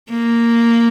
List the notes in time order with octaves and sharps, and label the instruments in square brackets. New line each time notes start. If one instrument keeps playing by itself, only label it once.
[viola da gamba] A#3